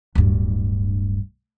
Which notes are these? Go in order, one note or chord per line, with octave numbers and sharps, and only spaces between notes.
D1 G2